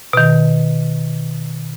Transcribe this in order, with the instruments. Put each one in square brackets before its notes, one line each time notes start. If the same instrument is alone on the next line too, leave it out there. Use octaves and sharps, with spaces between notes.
[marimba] B2 D#3